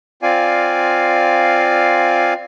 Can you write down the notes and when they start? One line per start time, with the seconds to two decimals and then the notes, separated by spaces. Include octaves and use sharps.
0.22 C4 F4 D5 F5 G#5